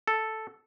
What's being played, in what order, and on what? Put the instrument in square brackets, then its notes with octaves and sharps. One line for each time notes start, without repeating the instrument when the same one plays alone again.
[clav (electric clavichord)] A4